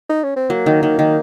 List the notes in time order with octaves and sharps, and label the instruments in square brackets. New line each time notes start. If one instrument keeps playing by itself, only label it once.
[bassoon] D#4
C#4
C4
[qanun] F#3 [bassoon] A#3
[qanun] D#3
D#3
D#3